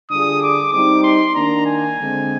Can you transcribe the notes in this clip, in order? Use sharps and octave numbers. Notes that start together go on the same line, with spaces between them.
D3 G3 D4 F4 G#4 D#6
D6
G3 C4 D#4 D6
C6
D#3 A#3 D4 A#5
G#5
D3 G#3 C4